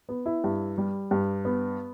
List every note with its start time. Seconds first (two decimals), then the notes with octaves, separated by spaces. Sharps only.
0.09 B3
0.26 E4
0.44 G2
0.78 G3
1.11 G2
1.45 B3